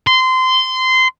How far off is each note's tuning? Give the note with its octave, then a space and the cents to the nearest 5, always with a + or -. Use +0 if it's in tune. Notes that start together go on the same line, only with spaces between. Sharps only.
C6 -20